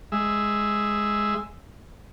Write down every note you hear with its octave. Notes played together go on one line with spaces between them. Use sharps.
G#3 E5